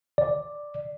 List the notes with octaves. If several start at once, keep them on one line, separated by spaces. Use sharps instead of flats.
D5